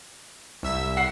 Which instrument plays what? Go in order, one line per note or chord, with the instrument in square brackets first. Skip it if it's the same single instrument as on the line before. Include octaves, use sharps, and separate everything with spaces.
[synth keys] C2 E5 E6
[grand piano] F#5 C7